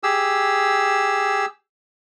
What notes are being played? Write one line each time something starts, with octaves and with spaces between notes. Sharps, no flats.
G4 G#4 E6